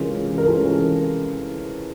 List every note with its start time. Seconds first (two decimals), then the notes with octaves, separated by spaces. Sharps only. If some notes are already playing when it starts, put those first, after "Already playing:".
Already playing: C3 E3 G#3 C#4 F4 A#4
0.38 A#4
0.46 C3 E3 G#3 C#4 F4 A4